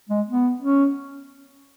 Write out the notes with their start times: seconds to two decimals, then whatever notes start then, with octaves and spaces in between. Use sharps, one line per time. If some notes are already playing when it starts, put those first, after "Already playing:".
0.09 G#3
0.27 B3
0.61 C#4